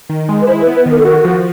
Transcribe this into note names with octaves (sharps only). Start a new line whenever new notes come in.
D#3
G#3
B4
E4 C5
B4
B3
B4
D#3
A#4
A4
F#4 A#4
F3